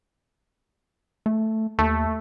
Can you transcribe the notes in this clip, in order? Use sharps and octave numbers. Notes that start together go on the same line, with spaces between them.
A3
D#2 A3